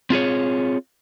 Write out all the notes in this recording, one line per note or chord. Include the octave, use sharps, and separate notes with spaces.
C4 F4 G#4 C#5